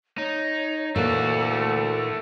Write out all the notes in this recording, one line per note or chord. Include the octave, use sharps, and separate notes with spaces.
D#4 C#5
D2 A#2 E3 A3 A#3 F#4 A4